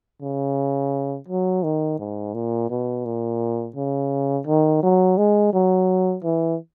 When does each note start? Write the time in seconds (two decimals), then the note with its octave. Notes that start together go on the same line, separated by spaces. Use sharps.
0.22 C#3
1.28 F#3
1.63 D#3
1.99 G#2
2.34 A#2
2.70 B2
3.05 A#2
3.76 C#3
4.47 D#3
4.83 F#3
5.18 G#3
5.53 F#3
6.24 E3